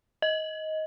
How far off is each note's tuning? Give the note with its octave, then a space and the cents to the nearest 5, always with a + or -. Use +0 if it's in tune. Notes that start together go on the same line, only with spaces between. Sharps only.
D#5 +15